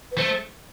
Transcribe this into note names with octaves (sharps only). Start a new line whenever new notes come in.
B4
A3 C5